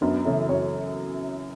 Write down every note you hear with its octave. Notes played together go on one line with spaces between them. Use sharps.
F#2 B3 D4
C#3 E3 B3 E4 A4 C#5
F#2 A4 C#5